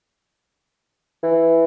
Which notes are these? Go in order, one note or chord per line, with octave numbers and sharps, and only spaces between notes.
E3